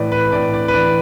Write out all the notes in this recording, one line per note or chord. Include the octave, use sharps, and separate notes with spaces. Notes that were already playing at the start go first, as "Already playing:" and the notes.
Already playing: A2 E3 B4 D5
B4
A2 D5
D5
B4
E3 D5